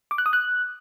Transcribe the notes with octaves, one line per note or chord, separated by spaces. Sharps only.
D6
F#6
D#6
F#6